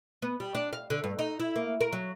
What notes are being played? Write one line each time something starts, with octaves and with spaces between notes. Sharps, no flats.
B3
G3
D4
F5
D3
G2
D#4
E4
A#3
A#4
F#3